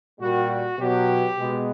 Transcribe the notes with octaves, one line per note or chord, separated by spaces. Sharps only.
A#2 G3 A#3 F#4
F#4
B2 F#3 B3 G4
B2 G#3 B3